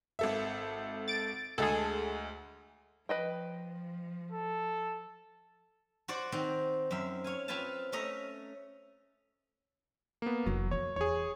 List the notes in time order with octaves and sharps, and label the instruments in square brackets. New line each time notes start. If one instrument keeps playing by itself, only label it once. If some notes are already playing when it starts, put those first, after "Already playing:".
[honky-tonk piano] G#1 A4 E5
[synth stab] A6 D7
[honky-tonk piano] D2 G#3 [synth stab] G#4 A4
[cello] F3 [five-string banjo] B4 D#5 G5
[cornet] A4
[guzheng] F#4 C5 D5 F#5
D#3 C4 C5
F#2 C4 E5
C#5 F5 G#5
C4 F4 B4 F5 G#5 A5
A3 C#4 D#5 E5 A#5
[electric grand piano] A#3 B3
[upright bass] F1 E3 [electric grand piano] F#3
[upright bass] F3 F#3 [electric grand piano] C#5
[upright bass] E2 [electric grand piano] G#4 C#5